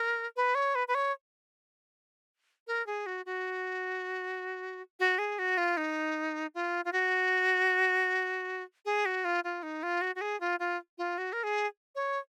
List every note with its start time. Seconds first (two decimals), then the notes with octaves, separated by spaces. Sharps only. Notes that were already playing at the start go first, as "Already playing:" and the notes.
Already playing: A#4
0.36 B4
0.55 C#5
0.75 B4
0.88 B4
0.94 C#5
2.67 A#4
2.86 G#4
3.06 F#4
3.26 F#4
5.00 F#4
5.18 G#4
5.39 F#4
5.57 F4
5.77 D#4
6.55 F4
6.85 F4
6.92 F#4
8.85 G#4
9.05 F#4
9.24 F4
9.44 F4
9.63 D#4
9.83 F4
10.01 F#4
10.15 F#4
10.21 G#4
10.40 F4
10.59 F4
10.98 F4
11.18 F#4
11.33 A#4
11.43 G#4
11.95 C#5